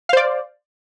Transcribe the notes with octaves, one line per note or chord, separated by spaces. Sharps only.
C5 D5 F5